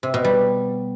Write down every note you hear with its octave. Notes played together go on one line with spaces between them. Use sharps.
C3
B2
G3